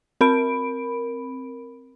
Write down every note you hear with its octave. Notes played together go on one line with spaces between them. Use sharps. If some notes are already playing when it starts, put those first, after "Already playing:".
C4 A#4 B5 D7